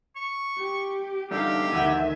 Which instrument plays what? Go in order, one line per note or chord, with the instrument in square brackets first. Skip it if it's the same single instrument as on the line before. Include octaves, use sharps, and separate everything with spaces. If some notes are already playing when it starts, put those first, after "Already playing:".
[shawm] C#6
[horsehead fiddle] G4
[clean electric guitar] E2 G2 D3 [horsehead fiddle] D#4 F5 [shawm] G4
[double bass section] D2 D#3 [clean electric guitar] E3 E4 F#5 [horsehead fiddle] E5 G#5